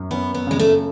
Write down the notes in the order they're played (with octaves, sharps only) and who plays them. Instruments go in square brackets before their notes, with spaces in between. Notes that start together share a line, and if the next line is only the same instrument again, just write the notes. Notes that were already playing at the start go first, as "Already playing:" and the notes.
Already playing: [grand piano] F#2
[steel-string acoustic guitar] B3 [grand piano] C#4
[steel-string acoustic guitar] B3
[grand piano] C#3 [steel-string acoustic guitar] G#3
[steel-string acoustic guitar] A3